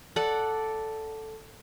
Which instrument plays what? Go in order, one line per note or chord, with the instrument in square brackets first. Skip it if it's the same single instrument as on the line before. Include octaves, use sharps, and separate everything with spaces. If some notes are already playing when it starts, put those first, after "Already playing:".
[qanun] A4 D5 F#5